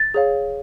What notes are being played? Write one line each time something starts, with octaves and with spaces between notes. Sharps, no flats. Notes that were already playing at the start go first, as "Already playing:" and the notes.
Already playing: A6
G#4 C#5 F5